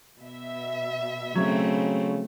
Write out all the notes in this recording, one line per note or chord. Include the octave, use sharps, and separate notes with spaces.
B2 E5
C#3 F#3 A3 C4